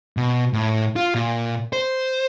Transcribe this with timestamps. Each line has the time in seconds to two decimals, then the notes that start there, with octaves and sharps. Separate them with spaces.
0.17 B2
0.53 A2
0.96 F4
1.15 A#2
1.73 C5